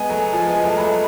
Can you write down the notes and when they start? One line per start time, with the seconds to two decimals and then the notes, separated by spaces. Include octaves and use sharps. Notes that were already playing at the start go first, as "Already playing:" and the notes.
Already playing: G#3 B3 G#5
0.09 F#3 A3
0.32 F3 G#3
0.47 G#3 B3
0.64 F#3 A3 A5
0.78 F#3 A3 B5